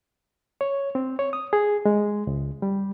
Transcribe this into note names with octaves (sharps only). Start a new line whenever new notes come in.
C#5
C4
C#5
D#6
G#4
G#3
C#2
G3